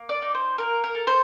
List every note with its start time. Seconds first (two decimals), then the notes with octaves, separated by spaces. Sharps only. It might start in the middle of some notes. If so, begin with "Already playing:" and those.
Already playing: A#3
0.09 D5
0.22 D#4
0.35 C5
0.58 A#3 A#4
0.84 A#4
0.95 A4
1.07 C5